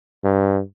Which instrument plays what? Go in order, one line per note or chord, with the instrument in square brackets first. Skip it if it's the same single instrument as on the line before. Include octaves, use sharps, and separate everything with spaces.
[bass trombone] G2